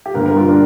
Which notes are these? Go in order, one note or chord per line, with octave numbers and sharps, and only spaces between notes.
G4
G2 D3 G3 A#3 A#4
A#4
F4
D4